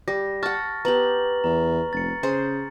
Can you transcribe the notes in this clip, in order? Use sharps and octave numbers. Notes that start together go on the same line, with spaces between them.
G3 A#6
F#5 A5 C#6 F6 A6
B3 G4 A#5 F#7
E2 A#5
F1 A6 C#7
C#3 G#4 C5